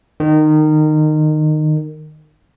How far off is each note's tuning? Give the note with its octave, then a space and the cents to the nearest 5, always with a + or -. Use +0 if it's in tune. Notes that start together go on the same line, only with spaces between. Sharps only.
D#3 -20